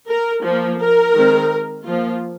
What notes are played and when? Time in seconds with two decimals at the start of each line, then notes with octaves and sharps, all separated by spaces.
0.08 A#4
0.44 F3 A#3
0.80 A#4
1.15 D#3 G#3 C4
1.85 F3 A#3 F4